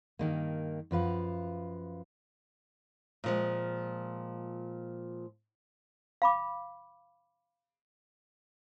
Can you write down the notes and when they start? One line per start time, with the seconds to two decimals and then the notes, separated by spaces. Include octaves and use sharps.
0.19 G2 D#3 A#3
0.91 F#2 F3 B4 F5
3.24 A#2 F3 G#3
6.22 F5 B5 D6